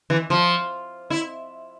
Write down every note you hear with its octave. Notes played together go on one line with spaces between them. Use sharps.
E3
F3
E4